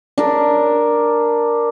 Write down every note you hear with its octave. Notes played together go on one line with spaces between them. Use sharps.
D4 A#4